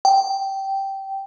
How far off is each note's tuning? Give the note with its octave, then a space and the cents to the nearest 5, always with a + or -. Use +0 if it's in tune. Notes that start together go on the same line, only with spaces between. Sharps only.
G5 -10